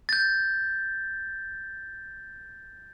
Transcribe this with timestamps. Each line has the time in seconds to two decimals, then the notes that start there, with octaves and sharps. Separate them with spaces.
0.09 G6 A6